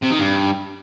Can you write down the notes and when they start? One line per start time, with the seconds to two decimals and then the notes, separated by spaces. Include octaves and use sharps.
0.02 C3
0.11 D#3
0.19 G2